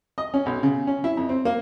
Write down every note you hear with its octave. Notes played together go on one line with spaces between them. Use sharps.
D#5
C#4
B1
C#3
C#4
E4
F2
C4
A#3